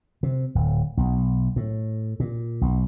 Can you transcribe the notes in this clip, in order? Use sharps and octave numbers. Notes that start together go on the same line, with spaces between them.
C3
D1
B1
A2
A#2
B1